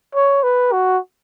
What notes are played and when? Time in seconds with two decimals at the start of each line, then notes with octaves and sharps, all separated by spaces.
0.15 C#5
0.43 B4
0.72 F#4